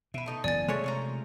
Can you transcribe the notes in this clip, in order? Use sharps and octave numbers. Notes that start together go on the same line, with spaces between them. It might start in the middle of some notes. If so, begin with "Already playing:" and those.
B2 B4 E5
A3 D#4 D#5
F#1 E3 B3 D5 G#5 A6
C3 G#3 A3 C#5
F3 C#4 A#5